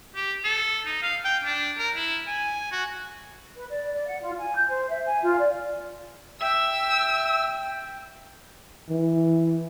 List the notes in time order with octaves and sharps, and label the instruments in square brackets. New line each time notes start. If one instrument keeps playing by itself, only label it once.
[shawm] G4
A4
D#4
F5
G5
D4
A#4
E4
G#5
F#4
[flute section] B4
D5
D5
F#5
F4
G#5
G6
C5
E5
G#5
F4
D5
[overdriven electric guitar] E5 [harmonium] G5 [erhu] E6
[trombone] E3